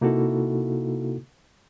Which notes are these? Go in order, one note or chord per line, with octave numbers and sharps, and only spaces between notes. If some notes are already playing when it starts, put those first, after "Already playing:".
C3 A#3 D#4 E4 F#4 A4